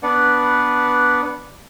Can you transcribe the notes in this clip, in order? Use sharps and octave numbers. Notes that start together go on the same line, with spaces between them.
B3 D4 B4 D5 F#5